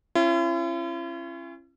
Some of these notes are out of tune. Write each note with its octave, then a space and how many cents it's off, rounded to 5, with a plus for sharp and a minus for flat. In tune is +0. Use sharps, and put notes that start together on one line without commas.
C#4 -30 E4 +45